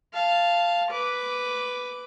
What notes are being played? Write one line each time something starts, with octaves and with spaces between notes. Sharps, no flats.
F5 A5
B4 D6